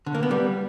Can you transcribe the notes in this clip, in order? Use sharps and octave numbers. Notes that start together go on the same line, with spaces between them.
D3
A#3
B3
G3